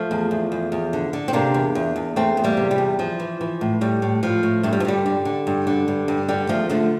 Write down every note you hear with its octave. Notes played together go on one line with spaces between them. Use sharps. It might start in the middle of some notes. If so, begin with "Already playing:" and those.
Already playing: F3 A3
E2
E2
E2
E2
D3
D3
C4
C3 A#3 D4
E2
E2
E2
E2 A3 C4
E2
G3 A#3
C3
G3
E2
E3 F3
E3
E3
A2
A2 G3
A2
A2 F3
A2
G2 A3
G3
F3
D3 G3
D3
D3
G2
D3
G2
G2
D3 G3
E2 F3 A3
D3 F3 A3